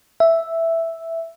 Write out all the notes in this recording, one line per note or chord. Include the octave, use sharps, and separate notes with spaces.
E5